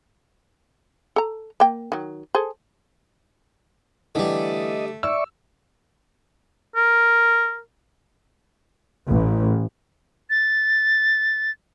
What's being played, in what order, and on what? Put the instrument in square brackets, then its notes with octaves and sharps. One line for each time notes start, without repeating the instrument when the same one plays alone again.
[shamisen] A4 A#5
A#3 G5
D#3 F#3
G#4 A4 C5
[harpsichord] D3 G3 [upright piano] E3 [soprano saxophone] A3 [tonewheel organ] D#5
[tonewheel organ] D5 E5 C#6 [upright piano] E6
[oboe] A#4
[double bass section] A1
[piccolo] A6